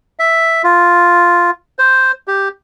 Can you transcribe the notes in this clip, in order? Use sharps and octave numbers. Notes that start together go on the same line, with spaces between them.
E5
F4
C5
G4